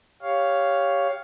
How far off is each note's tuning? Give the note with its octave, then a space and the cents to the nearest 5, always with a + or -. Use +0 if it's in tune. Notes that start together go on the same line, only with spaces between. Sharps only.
G4 +10 C#5 +5 F5 +0